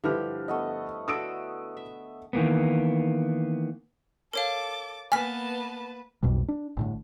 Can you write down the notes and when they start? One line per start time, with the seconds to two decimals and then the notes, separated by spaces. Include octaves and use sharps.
0.04 G2 D3 F3 E4 G4 B4 F6
0.48 A3 B3 D#5
1.08 D3 F#4 A4 D#6 E6 D7
1.77 E5
2.33 D#3 E3 A#3 B3
4.33 A4 A#4 C#5 F5 D6 A6
5.12 A#3 B3 B4 G#5 A5 F6 B6
6.23 B1 F2 B2 G3
6.48 D4
6.77 G1 A2 D3